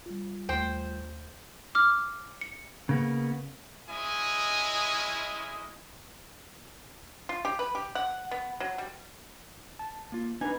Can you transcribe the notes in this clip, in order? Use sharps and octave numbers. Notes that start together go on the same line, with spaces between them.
G3 F4
D#2 A3 C5 G5
D6 F6
C#7
C#3 A#3 B3
G#3 C#4 E4 D#5 G#5 D#6
F4
G4
B4
G4
F#5
B3
F#3
G3
A5
A#3 F4
B3 D4 D#4 B4 G#5